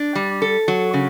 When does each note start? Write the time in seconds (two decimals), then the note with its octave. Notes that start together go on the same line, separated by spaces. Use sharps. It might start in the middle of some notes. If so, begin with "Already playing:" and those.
Already playing: D4
0.15 G3
0.42 A4
0.68 F#3
0.94 C#3